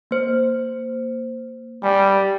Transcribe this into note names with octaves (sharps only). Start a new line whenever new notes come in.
A#3 C5
G3 G#5